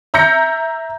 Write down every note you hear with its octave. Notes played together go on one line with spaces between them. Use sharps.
E5 A#5 G6 A#6 C#7